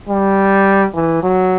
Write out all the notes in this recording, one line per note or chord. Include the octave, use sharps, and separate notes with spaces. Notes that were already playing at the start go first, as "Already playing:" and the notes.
G3
E3
F#3